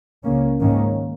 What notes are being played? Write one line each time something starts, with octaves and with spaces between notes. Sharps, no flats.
C#2 C#3 A#3 C#4
G#2 D#3 A#3 C#4